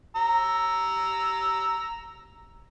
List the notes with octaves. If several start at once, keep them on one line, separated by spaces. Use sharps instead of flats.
A#5 E6